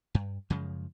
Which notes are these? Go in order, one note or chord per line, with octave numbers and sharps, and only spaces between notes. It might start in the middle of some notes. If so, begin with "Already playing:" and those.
G2
F#2 C#3 F3 G#3